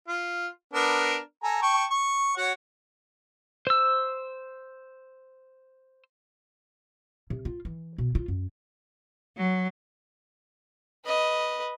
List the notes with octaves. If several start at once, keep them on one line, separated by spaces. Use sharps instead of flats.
F4
B3 D4 A#4
A4 G#5 A#5
G5 A5 C#6
C#6
F#4 C#5 F#5
C5 E6
C3
F4
E3
B2
F4
F#2
F#3
B4 D#5